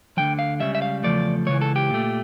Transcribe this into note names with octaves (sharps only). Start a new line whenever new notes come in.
D2 D3 F3 G5
F5
C#2 C#3 G3 E5
E5
F5
E2 C#3 F3 A3 D5
C#2 C#3 E3 C#5
A4
G4
A#2 A3